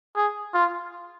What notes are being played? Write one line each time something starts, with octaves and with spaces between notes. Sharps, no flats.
G#4
F4